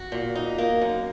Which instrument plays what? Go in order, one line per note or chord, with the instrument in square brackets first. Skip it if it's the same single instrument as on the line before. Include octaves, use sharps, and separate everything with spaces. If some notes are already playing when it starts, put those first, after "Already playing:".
Already playing: [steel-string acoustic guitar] F#4
A#2
D#4
A#3
F#2